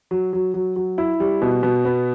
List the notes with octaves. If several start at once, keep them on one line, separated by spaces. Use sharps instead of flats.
F#3
F#3
F#3
F#3
E4
G3
B2
B2
B3